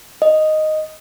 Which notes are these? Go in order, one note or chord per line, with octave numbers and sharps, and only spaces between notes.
D#5